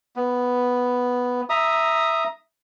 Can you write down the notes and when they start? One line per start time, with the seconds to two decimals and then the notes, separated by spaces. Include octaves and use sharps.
0.16 B3
1.50 E5 A#5 D#6